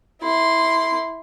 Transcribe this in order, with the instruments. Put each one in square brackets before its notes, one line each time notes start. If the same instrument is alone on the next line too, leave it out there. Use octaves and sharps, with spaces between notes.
[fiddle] E4 C6